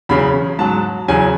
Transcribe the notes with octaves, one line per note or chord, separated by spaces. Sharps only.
E2 C#3 F#3 B5
G#2 F#3 A5
E2 C#3 F#3 G#5